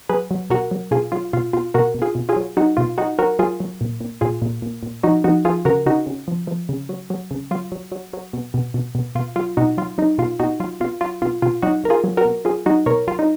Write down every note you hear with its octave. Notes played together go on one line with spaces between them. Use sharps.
F#3 G#4 B4
F#3
B2 F#4 A#4
F#3
B2 F4 G#4
F#3 F4
B2 F4
B2 F4
B2 F#4 A#4
B2
F4 G#4
B2
F4 G#4
F#3
F#3 D#4 F#4
B2 F4
F#3 D#4 F#4
F#3 F#4 A#4
F#3 F4 G#4
F#3
A#2
A#2
A#2 F4 G#4
A#2
A#2
A#2
F3 D#4 F#4
F3 D#4 F#4
F3 F4 G#4
C#3 F#4 A#4
C#3 D#4 F#4
C#3
F3
F3
C#3
F#3
F#3
C#3
F#3 F4
F#3
F#3
F#3
B2
B2
B2
B2
B2 F4
F#3 F4
B2 D#4 F#4
F#3 F4
F#3 D#4
B2 F4
B2 D#4 F#4
F#3 F4
B2 F4
F#3 F4
B2 F4
B2 F4
F#3 D#4 F#4
F#3 A#4
F4 G#4
F#3
F#4 A#4
B2
F#3 F4 G#4
F#3 D#4 F#4
B2 A#4 C#5
F#3 F4
D#4